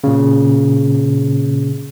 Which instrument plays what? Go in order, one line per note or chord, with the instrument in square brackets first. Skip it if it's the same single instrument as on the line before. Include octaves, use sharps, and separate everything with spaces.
[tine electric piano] A#2 C#3